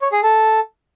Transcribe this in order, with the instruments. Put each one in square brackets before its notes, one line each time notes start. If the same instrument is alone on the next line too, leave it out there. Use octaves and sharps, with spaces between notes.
[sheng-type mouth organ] C#5
G#4
A4